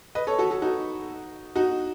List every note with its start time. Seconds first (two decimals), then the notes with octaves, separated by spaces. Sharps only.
0.15 B4 D#5
0.27 A4 C#5
0.39 F#4 A4
0.51 F#4 A4
0.62 D#4 F#4
1.55 D#4 F#4